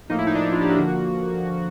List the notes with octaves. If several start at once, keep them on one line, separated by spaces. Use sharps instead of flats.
A2 F3 A#3 D#4
E4
D#4
D4
D#4
F4
G4
F#4
D3 F3 A#3